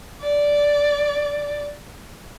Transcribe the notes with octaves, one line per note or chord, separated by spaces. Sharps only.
D5